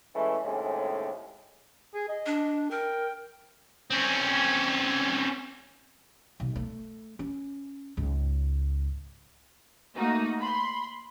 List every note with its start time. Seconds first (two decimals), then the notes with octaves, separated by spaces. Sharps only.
0.16 E3 G#3 A3 C#4
0.45 D#2 A2 C3 G#3 C#4
1.94 G#4
2.09 D#5
2.26 D4
2.71 A#4 G5
3.91 C4 C#4
6.40 B1
6.56 A3
7.19 C#4
7.97 C#2 G#2
9.96 A3 A#3 D#4 F#4
10.39 B5 C6